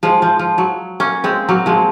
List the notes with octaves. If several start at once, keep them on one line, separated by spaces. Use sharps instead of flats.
F3 G#3
F3
F3
F#3
A#3 C#4
G#3 C4
F#3 A#3
F3 G#3